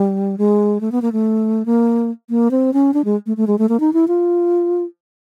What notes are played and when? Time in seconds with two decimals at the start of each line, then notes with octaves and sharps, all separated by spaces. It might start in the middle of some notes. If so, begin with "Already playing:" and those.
Already playing: G3
0.38 G#3
0.81 A3
0.92 B3
1.02 A#3
1.12 A3
1.66 A#3
2.30 A#3
2.51 C4
2.73 C#4
2.94 D4
3.05 G#3
3.26 A3
3.37 A3
3.47 G#3
3.59 A3
3.69 A#3
3.80 D#4
3.93 E4
4.08 F4